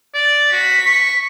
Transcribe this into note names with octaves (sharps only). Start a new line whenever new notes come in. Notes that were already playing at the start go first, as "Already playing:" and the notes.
D5
F#4 B6
C#6